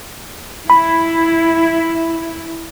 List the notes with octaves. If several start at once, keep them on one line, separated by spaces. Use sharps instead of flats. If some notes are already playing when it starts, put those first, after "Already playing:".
E4 B5